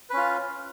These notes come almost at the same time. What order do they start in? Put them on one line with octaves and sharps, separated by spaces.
B4 C#4 F4